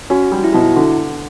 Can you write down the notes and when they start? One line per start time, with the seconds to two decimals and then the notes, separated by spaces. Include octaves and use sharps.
0.10 C#4 F#4
0.32 G3
0.44 E4
0.53 B2 F#4
0.61 E4
0.76 D3